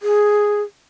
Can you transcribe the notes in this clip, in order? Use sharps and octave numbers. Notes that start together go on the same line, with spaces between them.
G#4